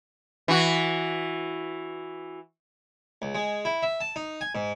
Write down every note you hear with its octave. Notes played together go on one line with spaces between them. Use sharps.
E3 F#4
C#2
G#3
E4
E5
A5
D#4
G#5
G#2